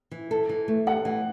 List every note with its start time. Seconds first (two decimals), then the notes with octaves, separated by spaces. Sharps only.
0.11 E3
0.31 A4
0.49 E3
0.68 A3
0.87 A4 F#5
1.05 E3